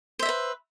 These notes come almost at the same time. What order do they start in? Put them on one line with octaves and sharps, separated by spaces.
C5 E5 D#5 B4